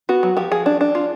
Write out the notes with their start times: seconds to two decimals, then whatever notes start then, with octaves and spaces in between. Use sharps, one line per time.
0.09 B3 F#4
0.23 F#3
0.37 F3 G4
0.51 F3 G#4
0.66 D4
0.81 D4
0.95 F4